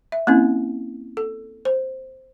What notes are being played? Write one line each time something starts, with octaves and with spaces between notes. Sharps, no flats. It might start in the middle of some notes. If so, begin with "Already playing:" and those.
E5
A#3 C4 C#4 E4
A4
C5